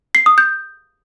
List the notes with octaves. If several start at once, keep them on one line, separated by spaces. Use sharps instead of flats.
C7
D#6
G6